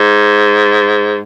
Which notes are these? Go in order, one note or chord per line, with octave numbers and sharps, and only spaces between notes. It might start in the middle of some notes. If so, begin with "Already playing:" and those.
Already playing: G#2